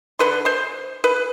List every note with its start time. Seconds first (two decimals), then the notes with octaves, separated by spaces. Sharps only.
0.19 D3 B4 C6
0.45 C5 C6
1.04 B4